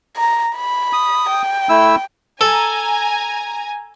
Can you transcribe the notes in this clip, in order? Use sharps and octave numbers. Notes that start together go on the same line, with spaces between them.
A#5
B5
D#6
G5
A3 E4 E6
A4 G#5 A#5